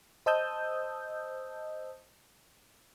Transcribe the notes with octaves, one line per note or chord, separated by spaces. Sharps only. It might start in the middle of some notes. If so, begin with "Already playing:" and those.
C5 D#5 A5 D#6 E6 G6